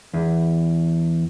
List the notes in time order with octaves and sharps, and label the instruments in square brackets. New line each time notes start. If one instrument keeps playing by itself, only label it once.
[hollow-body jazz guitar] E2